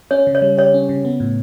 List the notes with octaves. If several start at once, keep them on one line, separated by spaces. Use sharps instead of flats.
C#4 C#5
C#3
C#5
G3
G4 C#5
C#4
C#3
B3
A2